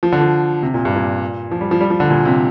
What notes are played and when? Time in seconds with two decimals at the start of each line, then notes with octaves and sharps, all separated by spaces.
0.03 F3
0.12 D3
0.21 F3
0.63 C3
0.74 A#2
0.85 G2
0.96 A#2
1.51 F3
1.61 G3
1.71 F3
1.81 G3
1.90 F3
2.00 D3
2.10 A#2
2.25 C3